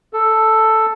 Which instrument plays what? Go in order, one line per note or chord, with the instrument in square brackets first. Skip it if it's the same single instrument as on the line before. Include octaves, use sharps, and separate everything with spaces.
[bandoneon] A4